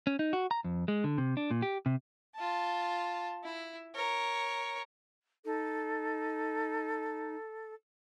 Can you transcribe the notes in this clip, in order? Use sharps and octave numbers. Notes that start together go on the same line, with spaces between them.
C#4
D#4
F#4
A#5
F2
G#3
D3
C3
D4
A#2
G4
C3
F4 A5
E4
A#4 C#5
D#4 A4